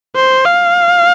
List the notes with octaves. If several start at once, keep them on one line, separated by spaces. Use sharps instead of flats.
C5
F5